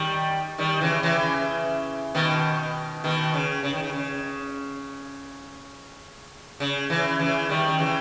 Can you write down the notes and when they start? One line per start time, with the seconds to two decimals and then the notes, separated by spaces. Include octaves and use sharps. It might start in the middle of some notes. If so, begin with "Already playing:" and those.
Already playing: D#3 G3
0.58 D#3 G3
0.81 C#3 E3
1.03 C#3 E3
2.15 B2 D#3
3.04 B2 D#3
3.34 C#3
3.63 C#3
3.73 D#3
3.83 C#3
3.93 C#3
6.60 C#3
6.90 C#3 E3
7.19 C#3 E3
7.49 D#3 G3
7.67 G3
7.79 C#3 E3